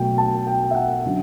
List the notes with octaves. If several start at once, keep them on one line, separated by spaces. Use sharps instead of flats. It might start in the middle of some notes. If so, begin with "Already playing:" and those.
Already playing: B2 F#3 A3 G5
A5
G5
E5
F#5
D3 F#3 C#4